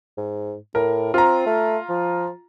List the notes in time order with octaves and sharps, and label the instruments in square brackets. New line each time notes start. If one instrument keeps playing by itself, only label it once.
[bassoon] G#2
[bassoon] A2 [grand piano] A#4
[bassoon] C4 [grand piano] F4 A#5
[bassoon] A3
F3